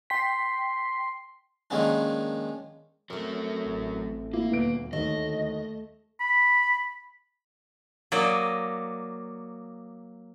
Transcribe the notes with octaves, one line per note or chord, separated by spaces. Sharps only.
G5 C6 B6
D#3 F3 G#3 A#3 C#4 D4
F#3 A3 C4 A#4
A1
A#3 E4
D#1 D2 B3 D7
D#2 A3 D#5
B5
F#3 A#3 D5 D#5